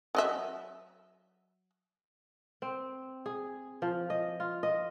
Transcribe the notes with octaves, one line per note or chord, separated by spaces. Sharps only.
F#3 D#5 E5
C4
G#4
F3
D#5
F4
D#5